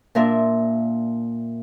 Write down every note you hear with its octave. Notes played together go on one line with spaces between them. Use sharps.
A#2 D4 A#4 E5